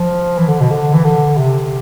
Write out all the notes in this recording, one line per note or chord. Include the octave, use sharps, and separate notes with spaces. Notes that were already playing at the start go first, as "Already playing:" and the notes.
Already playing: F3
E3
D3
B2
D3
E3
D3
C3